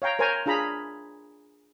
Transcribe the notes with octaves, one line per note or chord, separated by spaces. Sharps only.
C#5 F5 G5 A#5
A#4 C5 C#5 G#5 A#5
D4 F4 G#4 A#5 B5